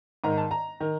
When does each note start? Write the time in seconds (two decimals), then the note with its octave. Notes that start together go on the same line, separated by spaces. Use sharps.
0.24 G#2 D#3 A#5
0.38 A5
0.51 A#5
0.80 D#3